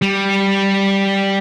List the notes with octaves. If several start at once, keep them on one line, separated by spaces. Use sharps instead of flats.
G3